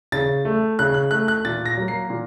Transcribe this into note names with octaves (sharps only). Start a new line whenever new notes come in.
C#3 A6
A3
C#3 F#6
F#6
A3 F#6
F#6
A#2 A6
A#6
F#3 A#3
C7
A#2